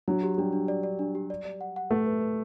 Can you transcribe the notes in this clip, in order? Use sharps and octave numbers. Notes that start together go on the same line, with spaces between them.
F#3 D4
G4
G3 D4
D4
D5
D5
D4
G4
D5
D5
F#5
F#5
A3 B4
B4
B4